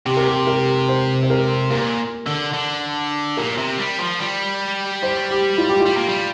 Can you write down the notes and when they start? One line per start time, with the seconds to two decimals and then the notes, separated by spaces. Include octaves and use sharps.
0.06 C3 G4
0.17 A#4
0.28 G4
0.47 A#4
0.89 C5
1.23 C5
1.30 A#4
1.71 A#2 A#4
2.27 D3
2.54 D3
3.37 A#2 A#4
3.57 C3
3.79 G3
3.99 F3
4.19 G3
5.03 C5
5.31 G4
5.58 F4
5.69 G4
5.80 F4
5.86 G3
5.97 A#3
6.09 G3